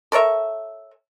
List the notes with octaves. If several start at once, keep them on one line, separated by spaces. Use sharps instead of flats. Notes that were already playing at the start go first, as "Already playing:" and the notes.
A4 A#4 C#5 E5